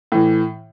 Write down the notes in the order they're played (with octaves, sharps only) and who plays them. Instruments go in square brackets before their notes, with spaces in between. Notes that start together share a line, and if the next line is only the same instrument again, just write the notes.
[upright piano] A2 E3